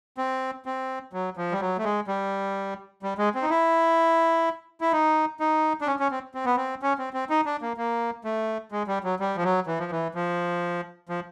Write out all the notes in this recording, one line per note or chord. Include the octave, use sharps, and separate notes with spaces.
C4
C4
F#3
F3
G3
F#3
A3
G#3
G3
G3
G#3
C4
D#4
E4
E4
D#4
D#4
D4
C#4
C#4
C4
C4
B3
C4
C#4
C4
C4
D#4
D4
A#3
A#3
A3
G#3
G3
F#3
G3
F3
F#3
E3
F3
E3
F3
F3